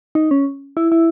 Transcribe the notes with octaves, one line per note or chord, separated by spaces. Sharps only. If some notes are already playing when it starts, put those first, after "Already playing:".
D#4
C#4
E4
E4